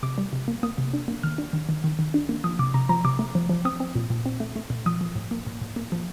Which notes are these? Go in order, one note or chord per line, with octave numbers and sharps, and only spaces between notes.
C3 D6
G3
C3
A#3
A#3 D#6
C3
D4
A#3
D#3 F6
D4
D#3
D#3
D#3
D#3
D4
A#3
F3 D#6
C3 D6
C3 A#5
F3 A#5
C3 D6
A3
F3
F3
C4 D#6
C4
A#2
A#2
C4
A3
A3
A#2
F3 D#6
F3
A2
A#3
A2
A2
A#3
F3